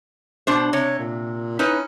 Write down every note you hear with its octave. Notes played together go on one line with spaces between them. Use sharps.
B2 D4 C5
C3 C#5
A#2
C#4 D#4 E4 B4